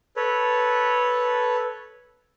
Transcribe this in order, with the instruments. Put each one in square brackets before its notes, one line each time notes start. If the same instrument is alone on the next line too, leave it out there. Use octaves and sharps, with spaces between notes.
[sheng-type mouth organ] A4 B4 C#5